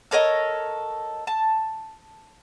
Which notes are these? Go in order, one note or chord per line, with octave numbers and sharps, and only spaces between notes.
A4 A#4 C#5 D#5
A5